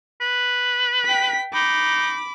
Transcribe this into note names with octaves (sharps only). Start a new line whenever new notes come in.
B4
G5 B6
D#4 B5 D6